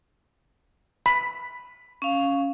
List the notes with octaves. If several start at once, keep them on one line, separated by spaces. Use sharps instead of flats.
B5
C#4 F5